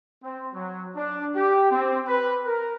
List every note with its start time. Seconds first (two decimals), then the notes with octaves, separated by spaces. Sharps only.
0.23 C4
0.54 F#3
0.96 D4
1.35 G4
1.70 C4
2.06 B4
2.45 A#4